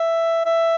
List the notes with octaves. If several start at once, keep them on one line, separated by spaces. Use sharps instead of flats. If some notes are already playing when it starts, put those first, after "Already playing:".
Already playing: E5
E5